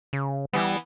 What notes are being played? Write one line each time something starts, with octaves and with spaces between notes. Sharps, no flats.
C#3
E3 G3 B3